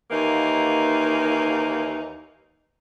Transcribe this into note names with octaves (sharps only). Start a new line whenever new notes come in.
D#2 E3 A#3 D#4